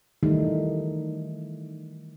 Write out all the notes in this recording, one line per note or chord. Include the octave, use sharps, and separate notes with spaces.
D#3 E3 G3 A3 D#4